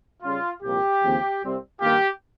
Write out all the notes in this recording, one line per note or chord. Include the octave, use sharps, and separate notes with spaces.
C#3 G3 C#4 F4
C2 A#2 F3 A#3 G4
D#2 C#3 F3 C4
C2 C3 G3 C4
G2 D#3 A#3 F4 G4